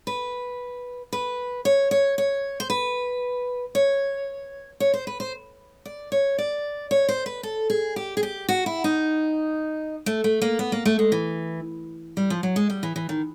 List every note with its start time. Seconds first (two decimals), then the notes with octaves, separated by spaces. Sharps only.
0.07 B4
1.13 B4
1.65 C#5
1.91 C#5
2.18 C#5
2.60 C5
2.70 B4
3.75 C#5
4.80 C#5
4.93 C5
5.07 B4
5.20 C5
5.85 D5
6.12 C#5
6.38 D5
6.91 C#5
7.08 C5
7.26 B4
7.43 A4
7.70 G#4
7.96 G4
8.17 G#4
8.23 G4
8.49 F#4
8.66 E4
8.84 D#4
10.06 A3
10.24 A3
10.42 A#3
10.59 B3
10.72 A#3
10.85 A3
10.99 G#3
11.12 E3
12.17 G3
12.30 F3
12.43 F#3
12.56 G#3
12.70 G3
12.83 E3
12.96 E3
13.09 D#3